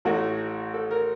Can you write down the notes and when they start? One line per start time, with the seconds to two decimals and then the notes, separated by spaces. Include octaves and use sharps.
0.05 A1 A2 A3 F#4
0.74 A4
0.91 A#4